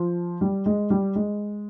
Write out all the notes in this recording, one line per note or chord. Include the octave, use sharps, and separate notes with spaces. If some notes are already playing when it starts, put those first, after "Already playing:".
Already playing: F3
G3
G#3
G3
G#3